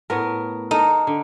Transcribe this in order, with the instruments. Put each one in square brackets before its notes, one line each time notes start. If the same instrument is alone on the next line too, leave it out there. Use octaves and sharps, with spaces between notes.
[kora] A2 B3 A#4
[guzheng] D#4 [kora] A4 A#4
[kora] D3